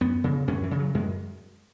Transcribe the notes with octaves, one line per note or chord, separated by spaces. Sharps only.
F#2 B3
C#3
F#2 C#4
E3
C#3
F#3
F#2 G#3